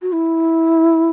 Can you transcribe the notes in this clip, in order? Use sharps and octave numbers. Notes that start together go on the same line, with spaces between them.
F#4
E4